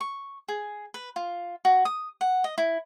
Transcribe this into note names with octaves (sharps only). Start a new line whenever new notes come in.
C#6
G#4
B4
F4
F#4
D#6
F#5
D#5
E4